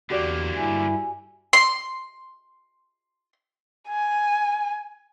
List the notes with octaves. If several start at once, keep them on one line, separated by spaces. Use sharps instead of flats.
E2 D3 A#3 F#4 G4 D5
G2 E4 G#5
C6 C7
G#5